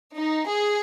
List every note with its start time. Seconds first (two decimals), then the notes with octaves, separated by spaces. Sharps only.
0.17 D#4
0.49 G#4